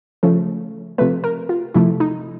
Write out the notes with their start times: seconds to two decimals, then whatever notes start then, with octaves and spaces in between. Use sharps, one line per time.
0.23 C#3 F3 A3
0.98 C3 F3 A3 B4
1.24 A#4
1.49 F4
1.74 C3 F3 A3 E4
2.00 D#4